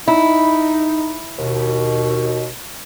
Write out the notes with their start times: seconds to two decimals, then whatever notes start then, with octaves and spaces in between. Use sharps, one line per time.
0.08 D#4 E4
1.39 D#2 B2